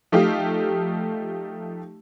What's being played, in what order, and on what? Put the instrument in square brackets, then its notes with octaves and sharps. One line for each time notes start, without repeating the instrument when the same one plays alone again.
[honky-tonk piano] F3 A3 D#4 F4 G4